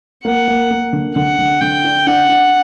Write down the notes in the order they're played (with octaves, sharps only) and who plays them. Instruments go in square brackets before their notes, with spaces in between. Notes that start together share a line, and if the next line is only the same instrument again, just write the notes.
[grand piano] A#3 [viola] F#5
[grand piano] A#3
A#3
D3
[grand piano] D3 [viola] F#5
[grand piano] D3
[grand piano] D3 [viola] G5
[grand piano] D4
[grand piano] D4 [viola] F#5
[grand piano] D4